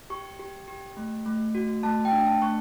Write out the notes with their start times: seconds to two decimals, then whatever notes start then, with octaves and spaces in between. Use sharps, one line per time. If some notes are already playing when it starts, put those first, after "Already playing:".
0.10 G4 C#6
0.39 G4
0.68 G4
0.97 A3
1.26 A3
1.55 F#4
1.83 A3 A5
2.05 G5
2.12 D4
2.26 A5
2.41 A3 C#6